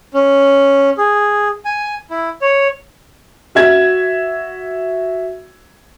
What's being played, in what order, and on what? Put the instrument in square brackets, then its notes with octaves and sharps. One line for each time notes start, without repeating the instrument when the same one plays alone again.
[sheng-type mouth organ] C#4
G#4
G#5
E4
C#5
[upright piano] F#4 E5 G#6